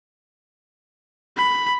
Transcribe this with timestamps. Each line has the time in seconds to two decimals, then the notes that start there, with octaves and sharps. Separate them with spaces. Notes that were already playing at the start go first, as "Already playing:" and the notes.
1.37 B5